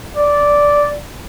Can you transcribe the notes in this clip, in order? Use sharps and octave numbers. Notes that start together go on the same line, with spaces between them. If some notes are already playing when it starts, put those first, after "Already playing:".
D5